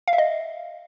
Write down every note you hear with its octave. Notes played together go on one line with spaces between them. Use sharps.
F5
E5
D#5